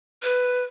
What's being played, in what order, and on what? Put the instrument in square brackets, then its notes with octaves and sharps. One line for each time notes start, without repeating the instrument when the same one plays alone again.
[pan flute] B4